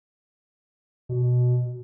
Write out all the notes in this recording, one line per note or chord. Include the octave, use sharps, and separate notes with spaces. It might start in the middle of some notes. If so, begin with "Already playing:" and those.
B2